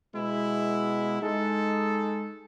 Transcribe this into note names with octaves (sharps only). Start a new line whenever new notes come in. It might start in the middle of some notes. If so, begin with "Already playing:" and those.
B2 G#3 B3 E4
G#3 D#4 A4